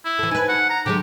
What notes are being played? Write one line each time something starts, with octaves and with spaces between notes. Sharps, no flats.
E4
E3 A4
D#4 B4 G#5
F#5
A#5
D3 F#3 G#3 G4